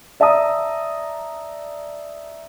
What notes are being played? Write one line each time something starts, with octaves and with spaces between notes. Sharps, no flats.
D5 E5 A5 A#5 D#6